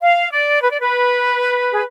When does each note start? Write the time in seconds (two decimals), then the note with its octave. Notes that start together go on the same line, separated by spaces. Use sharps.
0.02 F5
0.32 D5
0.62 B4
0.71 D5
0.80 B4
1.71 G#4